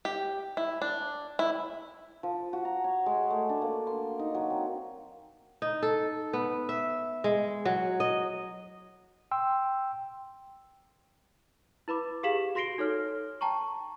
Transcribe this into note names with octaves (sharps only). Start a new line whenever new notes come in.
G4
E4
D4
E4
F3
F#4
A#5
C#5
G#3
A3
D4
A#3
C6
D#4
F#3
C4
D#4
A4
B3
E5
G#3
F#3
D#5
G5 C6 E6
E4 B4 B5 D6
G4 G#4 F5 B6 E7 F#7
F#4 C6 A#6 C7 D7 G7
D#4 A4 C#5 F6
G5 A5 A#5 C#6